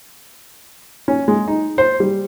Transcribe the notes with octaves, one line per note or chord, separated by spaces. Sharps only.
C#4
G#3
D#4
C5
G3